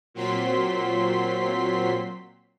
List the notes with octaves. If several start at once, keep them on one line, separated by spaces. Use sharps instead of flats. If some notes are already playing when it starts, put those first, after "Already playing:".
A#2 F#3 C4 C6 B6